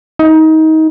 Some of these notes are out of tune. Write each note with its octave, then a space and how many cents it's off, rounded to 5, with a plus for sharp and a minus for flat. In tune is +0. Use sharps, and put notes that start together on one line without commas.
D#4 +25